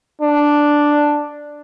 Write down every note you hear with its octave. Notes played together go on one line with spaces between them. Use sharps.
D4